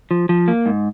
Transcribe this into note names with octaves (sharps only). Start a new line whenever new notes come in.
F3
F3
A#3
G#2